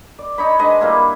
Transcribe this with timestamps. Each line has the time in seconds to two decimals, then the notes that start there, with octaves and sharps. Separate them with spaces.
0.19 D5
0.38 D#4 C#5 B5
0.59 G#3 D4 B4 D#5
0.81 G3 A#3 E4